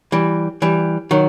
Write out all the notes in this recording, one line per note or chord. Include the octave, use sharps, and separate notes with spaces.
E3 G3
E3 G3
D#3 F#3